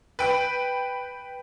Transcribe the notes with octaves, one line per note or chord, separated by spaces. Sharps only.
B4 G5 B5